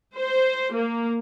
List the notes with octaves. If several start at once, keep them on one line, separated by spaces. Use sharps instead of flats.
C5
A#3